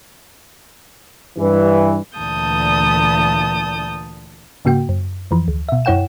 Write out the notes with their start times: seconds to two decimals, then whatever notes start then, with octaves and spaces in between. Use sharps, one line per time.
1.38 G2 E3
2.18 D2 A#2 E3 A5 D#6 G6
4.65 G#2 C#3 A#3 F#4 G5
4.89 F#2
5.31 F2 E3 F3
5.48 D2
5.69 B2 E5
5.85 F#2 E4 C#5 F#5 G5 E7